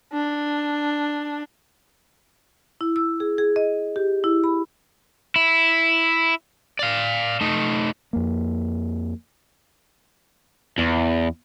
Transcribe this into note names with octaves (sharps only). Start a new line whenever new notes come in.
D4
E4
E6
G#4
G#4
D#5
G4
E4
B5
E4
D5 F5
A3 D#4
F2 A#3
E2